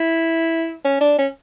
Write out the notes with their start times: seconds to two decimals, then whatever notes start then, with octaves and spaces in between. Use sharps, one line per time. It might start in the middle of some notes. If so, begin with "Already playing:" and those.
Already playing: E4
0.85 C#4
1.01 D4
1.19 C#4